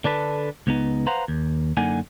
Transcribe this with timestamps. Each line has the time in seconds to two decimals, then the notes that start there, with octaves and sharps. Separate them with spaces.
0.04 D3 D4 A4 B4
0.67 C#2 B3 D#4
1.07 B4 C5 F5 F#5 A#5 C6
1.28 D#2
1.77 F#2 D3 A#3 D#4 F#5 G#5